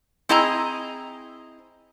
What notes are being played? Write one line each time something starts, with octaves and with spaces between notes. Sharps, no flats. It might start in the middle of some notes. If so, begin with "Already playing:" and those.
C4 E4 G#4 D#5 G#5 A#5